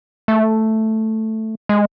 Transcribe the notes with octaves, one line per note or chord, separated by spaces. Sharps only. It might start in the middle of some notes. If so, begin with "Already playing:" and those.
A3
G#3